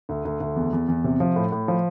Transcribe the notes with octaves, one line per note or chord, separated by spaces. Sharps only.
D2
D2
D2
E2
E2
E2
C3
F3
A2
A2
F3